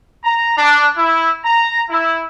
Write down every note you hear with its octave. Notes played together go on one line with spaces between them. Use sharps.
A#5
D4
E4
A#5
E4